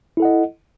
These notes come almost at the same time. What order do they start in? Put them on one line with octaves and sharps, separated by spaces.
E4 A4 F#5 D#5